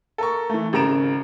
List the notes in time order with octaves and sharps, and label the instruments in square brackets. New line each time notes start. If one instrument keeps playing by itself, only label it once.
[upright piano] A4 A#4 C#6
E3 A3
G#1 C#3 A#4 A#5 D7 E7